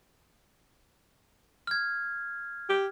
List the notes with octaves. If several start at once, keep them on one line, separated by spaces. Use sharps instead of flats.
F6 G#6
G4